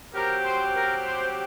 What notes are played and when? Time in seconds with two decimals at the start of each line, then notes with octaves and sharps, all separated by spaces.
0.13 F#3 C4 G4 A#4
0.44 C5
0.74 A#4
1.05 C5